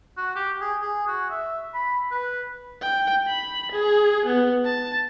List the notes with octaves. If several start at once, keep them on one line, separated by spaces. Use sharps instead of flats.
F#4
G4
G#4
G#4
F#4
E5
B5
B4
G5
B5
G#4
B3
A5